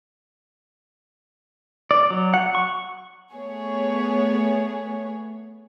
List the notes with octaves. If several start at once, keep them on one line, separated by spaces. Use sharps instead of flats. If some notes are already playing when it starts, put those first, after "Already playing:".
D5
F#3
F#5
C#6
A3 B3 G#4 C#5